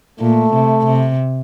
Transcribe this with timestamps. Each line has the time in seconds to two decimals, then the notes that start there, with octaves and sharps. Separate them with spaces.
0.20 A#2 A3
0.53 C3
0.86 C3